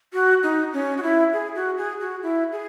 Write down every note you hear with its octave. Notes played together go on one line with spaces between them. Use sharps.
F#4
D#4
C#4
F#4
E4
G#4
F#4
G#4
F#4
E4
G#4